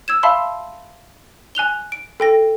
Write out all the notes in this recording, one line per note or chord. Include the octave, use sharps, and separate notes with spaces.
E6 G#6 E7
E5 F5 A5 B5 C6 E6
G#5 F#6 F7 G7
D7
A4 G5 A#6